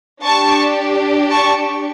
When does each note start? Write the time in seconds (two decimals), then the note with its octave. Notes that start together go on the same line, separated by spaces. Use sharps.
0.23 D4 G4 A5 C#6
1.30 A5 C#6